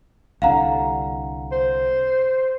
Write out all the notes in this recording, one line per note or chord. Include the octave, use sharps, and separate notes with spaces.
C2 D3 F5 F#5 A#5
C5